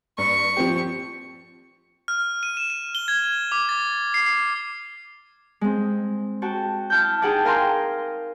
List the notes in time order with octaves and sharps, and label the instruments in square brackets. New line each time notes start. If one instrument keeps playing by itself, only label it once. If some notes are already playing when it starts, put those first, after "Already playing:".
[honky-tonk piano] G2 [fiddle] C#6
[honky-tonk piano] F3 C4 G4
[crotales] F6
D#7
E7
D#7
G7
G#6
D6
A6
C7
C7
[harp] G#3 C4
F#4 G5 A5
E4 A5 F6 G6
D#4 G#4 F#5 G5 A5 D6
A#4 F5 G5 G#5 A#5 C6